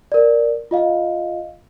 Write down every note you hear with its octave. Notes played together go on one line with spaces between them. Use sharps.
A#4 D5
F4 D#5 F5